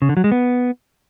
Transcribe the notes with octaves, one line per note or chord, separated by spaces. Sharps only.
C#3
D3
F#3
G#3
B3